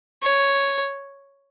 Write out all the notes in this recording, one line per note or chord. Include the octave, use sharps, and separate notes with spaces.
C#5